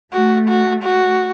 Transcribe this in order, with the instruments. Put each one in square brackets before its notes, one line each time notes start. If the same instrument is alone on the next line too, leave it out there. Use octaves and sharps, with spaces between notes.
[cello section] A3 [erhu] F#4
[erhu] F#4
F#4